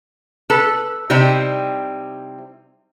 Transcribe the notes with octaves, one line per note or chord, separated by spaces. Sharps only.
A4 B4 A5
C3 G3 C4 D#4 E4